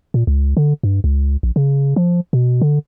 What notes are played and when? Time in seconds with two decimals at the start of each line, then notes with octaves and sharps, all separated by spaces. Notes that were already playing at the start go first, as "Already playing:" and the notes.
0.14 A#2
0.27 C#2
0.57 D3
0.83 G2
1.04 C#2
1.43 A#1
1.56 C#3
1.96 F3
2.33 B2
2.62 D3